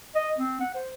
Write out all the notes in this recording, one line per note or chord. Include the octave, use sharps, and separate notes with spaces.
D#5
C4
F#5
C5